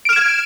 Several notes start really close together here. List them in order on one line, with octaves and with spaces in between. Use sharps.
D7 F6 E7 G#6